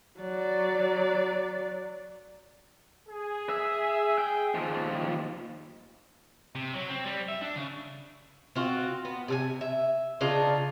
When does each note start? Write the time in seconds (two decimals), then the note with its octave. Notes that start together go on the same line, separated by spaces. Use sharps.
0.20 F#3 D5
3.09 G#4
3.49 E5
4.18 G5
4.55 D#2 F3
6.55 C3
6.74 F#3
6.90 C4
7.06 G3
7.29 E5
7.41 D4
7.56 C#3
8.55 C4 F4 F#4
9.05 B3
9.28 C3 A4 G#5
9.61 E5
10.21 C#3 D4 D#4 F4